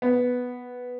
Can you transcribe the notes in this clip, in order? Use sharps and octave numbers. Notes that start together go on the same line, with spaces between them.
B3